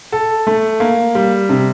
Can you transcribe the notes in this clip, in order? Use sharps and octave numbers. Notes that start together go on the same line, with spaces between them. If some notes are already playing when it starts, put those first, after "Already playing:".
A4
A3
A#3
G3
C3